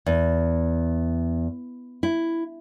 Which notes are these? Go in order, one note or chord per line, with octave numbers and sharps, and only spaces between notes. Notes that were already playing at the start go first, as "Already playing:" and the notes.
E2
E4